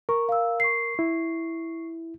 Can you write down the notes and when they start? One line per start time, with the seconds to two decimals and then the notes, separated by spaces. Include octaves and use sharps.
0.09 A#4 C#6
0.29 F5 E6
0.60 C#6 C7
0.99 E4